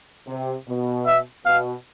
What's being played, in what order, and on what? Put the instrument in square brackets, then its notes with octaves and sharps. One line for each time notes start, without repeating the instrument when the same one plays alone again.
[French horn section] C3
B2
[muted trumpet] E5
[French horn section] B2 [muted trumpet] F5